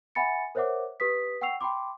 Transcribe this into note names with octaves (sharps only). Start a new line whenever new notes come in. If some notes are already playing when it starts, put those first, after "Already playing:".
E5 F#5 G#5 B5 A6 C#7
A#4 C5 C#5 E5 F#5 D6
G4 B4 D#6 B6
F#5 G5 C#6 E6 C7 F7
G5 B5 C6 D6